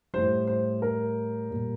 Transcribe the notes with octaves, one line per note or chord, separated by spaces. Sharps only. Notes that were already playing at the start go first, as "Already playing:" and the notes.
A2 G3 C5
C5
A#4
A#2 G3